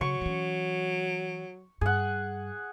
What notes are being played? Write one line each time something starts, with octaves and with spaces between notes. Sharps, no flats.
C#3 F#3 C#6
E3 C#4
G2 G#4 F#5